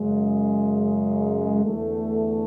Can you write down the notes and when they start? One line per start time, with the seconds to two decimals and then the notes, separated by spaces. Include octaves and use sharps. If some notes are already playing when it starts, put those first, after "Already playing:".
Already playing: F#2 C#3 G#3
1.64 E2 D3 A3